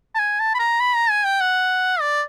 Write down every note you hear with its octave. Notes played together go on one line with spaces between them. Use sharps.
A5
G#5
A5
B5
A#5
B5
A#5
G#5
G5
F#5
D5